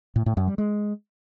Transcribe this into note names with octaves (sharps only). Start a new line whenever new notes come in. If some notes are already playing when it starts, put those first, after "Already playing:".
A2
A2
F#2
G3
G#3